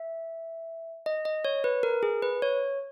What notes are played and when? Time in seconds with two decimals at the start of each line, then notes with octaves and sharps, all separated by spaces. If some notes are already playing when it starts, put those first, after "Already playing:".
Already playing: E5
1.06 D#5
1.25 D#5
1.45 C#5
1.64 B4
1.83 A#4
2.03 G#4
2.22 B4
2.42 C#5